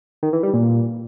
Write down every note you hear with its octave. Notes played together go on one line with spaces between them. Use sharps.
D#3
E3
G3
A#2